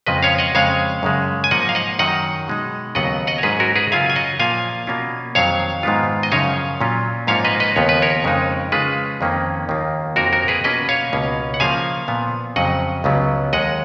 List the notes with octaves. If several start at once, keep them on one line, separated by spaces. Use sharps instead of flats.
F2 C#3 F3 G#3 B4 D#5
C#5 F5
D#5 F#5
F2 C#3 G#3 C#5 F5
F#2 C#3 G#3
G#5
G#2 F3 A#3 D#5 F#5
F5
D#5 F#5
F#2 D#3 F#3 D#5 F#5
B2 G#3 D#4
D#2 C#3 F#3 B3 D#5 F#5
D#5 F#5
C#5
G#2 F#3 C#4 G#4 B4
F#4 A#4
G#4 B4
F#2 C#3 F#3 C#4 F4 F5 G#5
G#5
D#5 F#5
A#2 F3 A#3 F4 F5 G#5
B2 A#3 C#4 F4
F2 D#3 F#3 C#5 F5
G#2 D#3 G#3 B3 F4
D#5
F#2 C#3 F3 C#5 F5
A#2 F#3 C#4 F4
G#2 F3 A#3 C#4 F4 C#5 F5
B4 D#5
B4 D#5
D#2 C#3 F3 B3 C#5
B4
A#4 C#5
F2 C#3 G#3 D#4
C#3 G#3 C#4 F4 G#4 B4
F2 D#3 A#3 C#4
D#2 D#3 A#3 F4
F2 F3 A#3 F#4 A#4
F#4 A#4
G#4 B4
B2 A#3 C#4 F4 B4 D#5
C#5 F5
C#2 B2 A#3 C#4
F#5
C#3 F3 A#3 F5 G#5
A#2 F3 B3
F2 C#3 F#3 D#5 F#5
C#2 C#3 F#3 B3
D#2 D#3 G#3 D#5 F#5